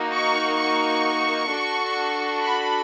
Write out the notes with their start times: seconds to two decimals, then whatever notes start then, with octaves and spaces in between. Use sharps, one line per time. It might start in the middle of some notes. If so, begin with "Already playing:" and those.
Already playing: A#3 D#4 F#4
0.12 C#6
0.57 C#6
1.49 D4 F#4 A4
2.40 B5